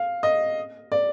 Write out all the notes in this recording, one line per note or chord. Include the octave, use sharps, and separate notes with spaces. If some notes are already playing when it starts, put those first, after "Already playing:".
Already playing: F5
D#5
D5